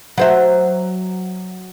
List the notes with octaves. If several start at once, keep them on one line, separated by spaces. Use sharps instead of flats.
F#3 C5 E5